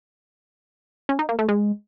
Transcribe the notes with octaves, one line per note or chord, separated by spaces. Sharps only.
C#4
D#4
A#3
A3
G#3